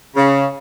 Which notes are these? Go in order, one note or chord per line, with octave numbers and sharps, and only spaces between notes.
C#3